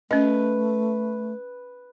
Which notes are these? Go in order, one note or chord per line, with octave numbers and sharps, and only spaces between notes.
A3 C#4 B4 D#5